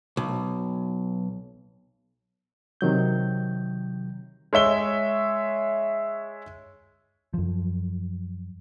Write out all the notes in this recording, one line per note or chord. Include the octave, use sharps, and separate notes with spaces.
B1
C3 D#3 F#3 G6
G#3 C#5 E5 G7
F#2 F3